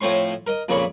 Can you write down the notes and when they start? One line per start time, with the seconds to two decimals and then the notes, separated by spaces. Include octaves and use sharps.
0.01 A2 F3 C4 C#5 C6
0.47 A#4 D#5
0.68 F2 A#2 C#3 C#5 B5